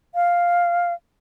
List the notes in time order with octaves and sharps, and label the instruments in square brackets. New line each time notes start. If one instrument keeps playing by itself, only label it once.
[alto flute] F5